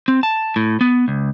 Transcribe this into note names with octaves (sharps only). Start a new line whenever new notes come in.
C4
A5
A2
B3
C#2